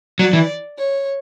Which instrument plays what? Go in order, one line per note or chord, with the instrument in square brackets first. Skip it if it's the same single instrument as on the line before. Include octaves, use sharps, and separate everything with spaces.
[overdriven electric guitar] F#3 [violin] D5
[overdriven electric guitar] E3
[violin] C#5